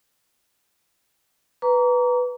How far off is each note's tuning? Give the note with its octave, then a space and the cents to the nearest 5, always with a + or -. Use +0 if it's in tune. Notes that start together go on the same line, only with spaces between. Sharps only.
B4 +0 A#5 +0 D6 -40